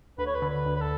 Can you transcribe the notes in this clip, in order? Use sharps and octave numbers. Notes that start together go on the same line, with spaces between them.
D2 B4
C#5
B4
D3
B4
D2
B4
A4